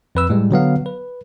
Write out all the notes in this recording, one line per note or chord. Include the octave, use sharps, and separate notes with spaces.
F2 B4 E6
A2 G3 G#3
D3 F#3 B3 F5
B4